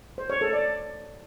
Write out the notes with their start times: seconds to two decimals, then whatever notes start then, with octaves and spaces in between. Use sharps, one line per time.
0.18 C5
0.30 C#5
0.41 A4
0.53 D5